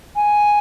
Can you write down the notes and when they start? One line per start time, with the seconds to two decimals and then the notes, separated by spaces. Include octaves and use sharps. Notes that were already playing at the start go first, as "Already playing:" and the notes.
0.16 G#5